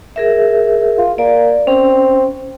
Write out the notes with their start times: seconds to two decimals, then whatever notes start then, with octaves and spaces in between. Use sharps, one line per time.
0.16 G#4 A#4 E5
0.98 F4
1.18 A#3 D5
1.67 C4 C#4